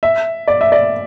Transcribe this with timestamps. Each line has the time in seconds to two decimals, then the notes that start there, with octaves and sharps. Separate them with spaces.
0.03 E5
0.48 D5
0.61 E5
0.72 D5